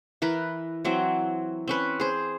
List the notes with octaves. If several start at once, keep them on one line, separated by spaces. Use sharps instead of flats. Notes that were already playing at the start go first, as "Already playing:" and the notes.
E3 A#4 B4
E3 F#3 C4
C4 C#4 B4
G#4 C5